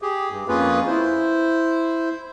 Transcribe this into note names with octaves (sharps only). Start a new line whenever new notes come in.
G4 G#4
G2
F2 A#3 C#4 F4 G#4 B4
E4 C5